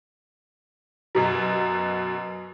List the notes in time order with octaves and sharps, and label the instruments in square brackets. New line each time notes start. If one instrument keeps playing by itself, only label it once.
[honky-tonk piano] F#2 B2 F#3